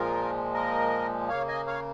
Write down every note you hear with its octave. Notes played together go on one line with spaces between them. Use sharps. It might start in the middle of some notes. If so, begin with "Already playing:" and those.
Already playing: A#2 F3 G#3 F4 A#4
A#4 D#5
C#3 A#3 C#5 F5
D#5 G#5
C#5 F5